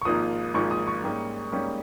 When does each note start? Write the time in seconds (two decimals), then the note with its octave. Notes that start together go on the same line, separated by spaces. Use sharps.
0.02 C#6
0.05 G#1 G#2 F3 A#3 F4 D#6
0.54 G#1 G#2 F3 A#3 F4 C#6
0.71 D#6
0.87 C#6
1.03 G#2 G3 A#3 C#4
1.52 G#2 G3 A#3 C#4